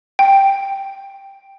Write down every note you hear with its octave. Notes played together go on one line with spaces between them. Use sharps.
G5